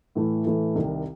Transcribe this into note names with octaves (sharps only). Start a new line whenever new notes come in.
A2 E3 A3
A2 E3 A3
C2 C3 D#3